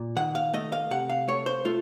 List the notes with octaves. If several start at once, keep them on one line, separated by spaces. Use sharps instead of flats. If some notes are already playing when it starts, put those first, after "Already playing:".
Already playing: A#2
D#3 F#5
F5
A3 D#5
F5
C3 F#5
F5
A3 C#5
C5
A3 F4